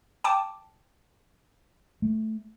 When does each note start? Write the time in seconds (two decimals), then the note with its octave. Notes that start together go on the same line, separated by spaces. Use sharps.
0.24 G5 A5 D6
2.02 A3